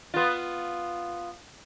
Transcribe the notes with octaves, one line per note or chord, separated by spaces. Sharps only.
B3 F4